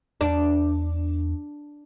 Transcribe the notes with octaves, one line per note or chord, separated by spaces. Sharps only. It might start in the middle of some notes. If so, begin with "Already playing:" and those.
E2 D4